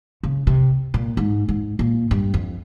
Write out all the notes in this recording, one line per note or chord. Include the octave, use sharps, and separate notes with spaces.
C#3
C3
A#2
G#2
G#2
A#2
G2
F2